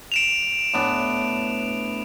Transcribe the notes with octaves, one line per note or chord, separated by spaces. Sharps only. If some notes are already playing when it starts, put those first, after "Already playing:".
D7 E7 F7
A2 B3 D4